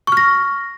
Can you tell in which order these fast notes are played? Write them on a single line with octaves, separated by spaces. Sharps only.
C#6 F6 A#6